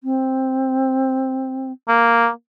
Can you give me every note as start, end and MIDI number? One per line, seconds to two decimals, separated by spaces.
0.03 1.72 60
1.88 2.29 58